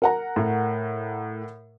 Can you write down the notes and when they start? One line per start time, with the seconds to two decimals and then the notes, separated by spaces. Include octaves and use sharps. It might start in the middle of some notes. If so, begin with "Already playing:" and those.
0.02 A#4 F#5 A#5
0.36 A2